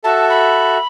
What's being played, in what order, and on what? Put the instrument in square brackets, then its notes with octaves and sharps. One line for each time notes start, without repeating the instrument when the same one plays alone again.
[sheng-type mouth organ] F#4 A4 E5 [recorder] A5
[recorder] B5